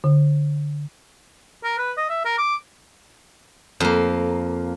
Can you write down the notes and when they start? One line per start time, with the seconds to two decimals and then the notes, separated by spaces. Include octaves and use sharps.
0.04 D3
1.64 A#4
1.78 B4
1.97 D#5
2.10 E5
2.25 A#4
2.38 D6
3.80 F2 A#3